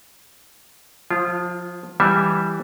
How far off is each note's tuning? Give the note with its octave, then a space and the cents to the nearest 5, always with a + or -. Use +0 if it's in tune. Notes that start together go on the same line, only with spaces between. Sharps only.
F3 +20 F4 -25
E3 +0 G3 +0 E5 +0